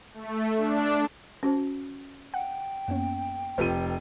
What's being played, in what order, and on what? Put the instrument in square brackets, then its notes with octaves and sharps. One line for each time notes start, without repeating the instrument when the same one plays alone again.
[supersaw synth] A3
D4
[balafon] C#4 F#4 C5
[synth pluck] F#5 [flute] G5
[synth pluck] F#2 C#4 [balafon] A#3 B3
[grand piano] F1 G4 D#7 [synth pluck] F4 A4 B4